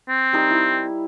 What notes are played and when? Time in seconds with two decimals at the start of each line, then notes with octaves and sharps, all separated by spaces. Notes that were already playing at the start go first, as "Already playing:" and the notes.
0.09 C4
0.33 G3 D#4 A#4
0.50 E4